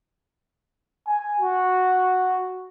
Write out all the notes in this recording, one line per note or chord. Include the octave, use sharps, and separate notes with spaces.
G#5
F#4